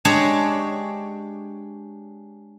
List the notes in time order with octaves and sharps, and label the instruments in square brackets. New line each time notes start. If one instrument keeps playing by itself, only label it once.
[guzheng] G#3 D4 G4 G#4 C#5